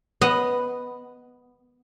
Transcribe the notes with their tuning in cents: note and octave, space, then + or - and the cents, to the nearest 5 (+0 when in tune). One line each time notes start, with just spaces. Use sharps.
B3 +0 D#5 +0 F#5 +5